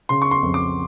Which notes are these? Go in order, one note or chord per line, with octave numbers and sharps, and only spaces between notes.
C#3 C6
C#6
C6
F2
D6